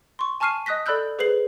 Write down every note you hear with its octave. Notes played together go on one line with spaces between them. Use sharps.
C6 C#6
G#5 A5 C#6 F6 C7 D#7
D#5 D#6 F#6 A#6 B6
A4 D5 B5 E6 F#6 G6
G#4 B4 C5 C7 F#7